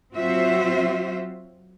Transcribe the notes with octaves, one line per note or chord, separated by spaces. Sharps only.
F#3 C4 F4 F#4 C5 E5